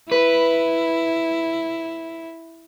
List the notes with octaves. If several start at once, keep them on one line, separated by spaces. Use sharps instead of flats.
E4 B4